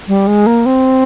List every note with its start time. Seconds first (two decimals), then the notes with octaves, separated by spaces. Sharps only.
0.08 G3
0.27 G#3
0.46 A#3
0.66 C4